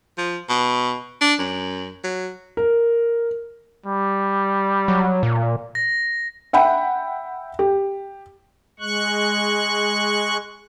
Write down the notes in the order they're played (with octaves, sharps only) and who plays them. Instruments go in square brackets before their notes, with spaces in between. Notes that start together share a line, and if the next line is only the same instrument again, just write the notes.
[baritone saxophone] F3
B2
D4
F#2
F#3
[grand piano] A#4
[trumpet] G3
[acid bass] F#3
A#2
[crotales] A#6
[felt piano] E5 F#5 G5 B5
G4
[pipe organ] G#3 C#6 F#6